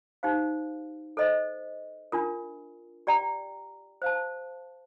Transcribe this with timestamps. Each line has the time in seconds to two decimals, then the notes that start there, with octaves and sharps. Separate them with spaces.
0.23 D#4 G4 C5 F5
1.17 A4 C5 D#5
2.12 D4 F4 A#4
3.07 G4 D5 G5 A#5
4.02 C5 F5 A5